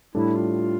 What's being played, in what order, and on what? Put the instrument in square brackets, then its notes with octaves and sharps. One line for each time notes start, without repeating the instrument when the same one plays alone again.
[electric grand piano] A2 G3 D4 A4 [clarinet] E4
[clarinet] F4